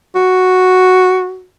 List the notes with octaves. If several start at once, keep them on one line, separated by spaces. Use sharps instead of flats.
F#4